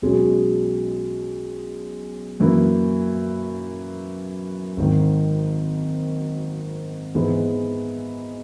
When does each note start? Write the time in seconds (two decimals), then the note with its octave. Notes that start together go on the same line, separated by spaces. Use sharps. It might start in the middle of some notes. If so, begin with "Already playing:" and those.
0.02 B1 B2 G#3 C#4
2.40 F#2 E3 A#3
4.77 G#1 G#2 D#3
7.15 G#2 E3 G#3 B3